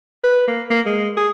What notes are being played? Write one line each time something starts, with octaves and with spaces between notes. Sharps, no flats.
B4
A#3
A#3
G#3
G#4